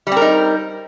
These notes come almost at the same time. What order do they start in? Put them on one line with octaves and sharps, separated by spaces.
G3 C4 A#4 D#4